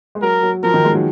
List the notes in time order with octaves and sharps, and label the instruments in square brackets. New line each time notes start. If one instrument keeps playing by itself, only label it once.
[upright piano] G#3
[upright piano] F#3 [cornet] A#4
[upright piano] F#3
[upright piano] F3 [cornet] A#4
[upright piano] D#3
G#3
F#3